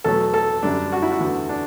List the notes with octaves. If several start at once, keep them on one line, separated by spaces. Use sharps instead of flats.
E2 B2 F#3 A3 A4
A4
F#2 D3 G3 D4
F#4
E4
F#4
E2 D3 A3
D4